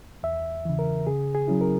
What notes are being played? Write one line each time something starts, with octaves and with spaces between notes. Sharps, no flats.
E2 E5
C#3 E3
A#4
C#3 G#4
G#4
F#3 C#4 E4
A#4